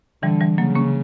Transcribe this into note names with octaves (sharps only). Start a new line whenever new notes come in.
D3 E3 G3
E3 G3
C#3 F#3 A#3
A#3 C#4